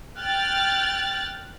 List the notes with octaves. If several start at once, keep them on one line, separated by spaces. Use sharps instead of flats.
G5 F6 F#6 A6